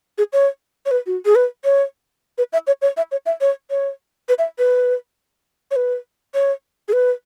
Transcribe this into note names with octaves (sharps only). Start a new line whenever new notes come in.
G#4
C#5
C#5
B4
F#4
G#4
B4
C#5
B4
E5
C#5
C#5
E5
C#5
E5
C#5
C#5
B4
E5
B4
C#5
B4
C#5
G#4
B4